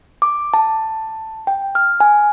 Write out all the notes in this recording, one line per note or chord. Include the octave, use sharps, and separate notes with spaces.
D6
A5
G5
F6
G#5